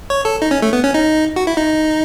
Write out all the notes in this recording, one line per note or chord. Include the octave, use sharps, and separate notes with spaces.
C#5
A4
D#4
C#4
A3
B3
C#4
D#4
F#4
E4
D#4